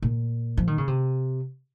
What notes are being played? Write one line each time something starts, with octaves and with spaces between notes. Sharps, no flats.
A#2
F3
D#3
C#3
C3